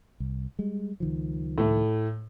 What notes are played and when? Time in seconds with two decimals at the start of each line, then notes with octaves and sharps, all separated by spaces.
0.20 C2
0.59 G3 G#3
1.00 C#2 D#3 F3
1.58 A2 A3